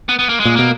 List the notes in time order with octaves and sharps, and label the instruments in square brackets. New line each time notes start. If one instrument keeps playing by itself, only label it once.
[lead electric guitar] B3
B3
A#3
G#3
[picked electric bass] A#2
[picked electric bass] B2 [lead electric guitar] A#3